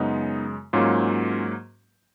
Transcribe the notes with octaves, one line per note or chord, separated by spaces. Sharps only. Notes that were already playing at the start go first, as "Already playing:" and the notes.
Already playing: F#2 C#3 G#3 B3 D#4
G#2 F#3 A#3 C#4 F4